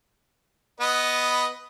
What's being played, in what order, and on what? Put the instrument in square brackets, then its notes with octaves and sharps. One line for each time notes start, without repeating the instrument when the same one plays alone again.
[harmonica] B3 B4 D#5